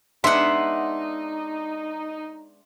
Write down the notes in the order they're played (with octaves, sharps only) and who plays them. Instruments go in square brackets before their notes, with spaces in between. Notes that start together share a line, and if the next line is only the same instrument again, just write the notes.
[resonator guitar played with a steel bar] G#3 B3 D4 [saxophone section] D#4 [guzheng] E5 F#5 [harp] C6